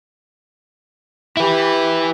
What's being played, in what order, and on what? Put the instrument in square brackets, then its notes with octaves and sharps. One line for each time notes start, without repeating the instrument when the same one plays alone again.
[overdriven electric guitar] E4 B4 [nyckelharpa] G4 B5